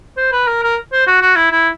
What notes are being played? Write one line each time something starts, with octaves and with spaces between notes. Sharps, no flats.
C5
B4
A#4
A#4
C5
F#4
F#4
E4
E4